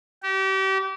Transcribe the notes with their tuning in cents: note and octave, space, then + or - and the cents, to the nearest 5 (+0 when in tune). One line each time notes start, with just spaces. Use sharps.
G4 -35